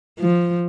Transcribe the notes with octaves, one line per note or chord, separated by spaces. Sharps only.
F3